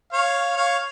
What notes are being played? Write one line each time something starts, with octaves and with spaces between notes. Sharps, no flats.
C#5 F5
C#5 F5